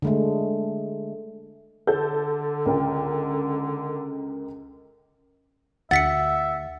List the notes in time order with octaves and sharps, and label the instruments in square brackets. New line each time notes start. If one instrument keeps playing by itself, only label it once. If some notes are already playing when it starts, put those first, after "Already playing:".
[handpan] D3 G#3 A3
[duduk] D3 [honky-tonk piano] A4 G6
[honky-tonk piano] C#2 A#4 G5
[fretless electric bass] D2 [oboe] E5 [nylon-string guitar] F#5 [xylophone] A6 B6 C#7